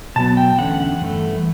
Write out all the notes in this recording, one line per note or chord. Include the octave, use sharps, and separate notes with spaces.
B2 F#3 B3 A5
G5
E2 D3 A3 C#4 F#5
G2 E3 A3